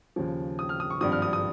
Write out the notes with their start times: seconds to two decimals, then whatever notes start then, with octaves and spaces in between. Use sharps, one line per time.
0.16 D#2 C#3 F3
0.59 D#6
0.69 F6
0.80 D#6
0.90 C#6
1.01 G#1 G2 F3 D#6
1.12 F6
1.22 D#6
1.33 D#6